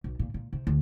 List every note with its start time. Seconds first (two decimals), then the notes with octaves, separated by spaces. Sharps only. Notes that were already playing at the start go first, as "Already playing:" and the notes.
0.04 B1
0.19 A#2
0.34 A#2
0.53 C3
0.67 D2